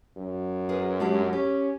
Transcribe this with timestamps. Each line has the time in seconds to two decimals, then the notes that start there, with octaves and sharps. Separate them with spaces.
0.17 F#2
0.69 G#4 A#4 B4
1.00 G#3 D4 G4
1.33 C#4 G4